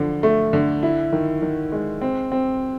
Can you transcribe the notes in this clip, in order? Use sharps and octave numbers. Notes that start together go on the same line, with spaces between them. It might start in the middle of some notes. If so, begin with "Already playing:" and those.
Already playing: D3 F3
A3
D3
E4
D#3
D#3
G#3
C4
C4